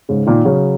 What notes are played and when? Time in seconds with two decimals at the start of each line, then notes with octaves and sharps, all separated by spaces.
0.09 G#2 C#3
0.27 A#2 D#3
0.45 C#3 F#3